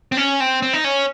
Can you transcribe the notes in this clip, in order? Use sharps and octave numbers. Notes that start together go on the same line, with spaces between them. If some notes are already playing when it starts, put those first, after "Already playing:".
C4
C#4
C4
C4
D#4
C#4